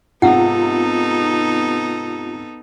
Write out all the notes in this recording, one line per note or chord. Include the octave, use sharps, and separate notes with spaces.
G#2 C3 B3 D#4 F4 A4 F#5